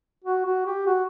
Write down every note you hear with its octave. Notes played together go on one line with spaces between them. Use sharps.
F#4
F#4
G4
F#4